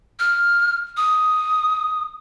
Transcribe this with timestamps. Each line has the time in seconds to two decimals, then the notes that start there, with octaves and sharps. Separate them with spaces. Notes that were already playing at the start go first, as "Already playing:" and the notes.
0.20 F6
0.97 D#6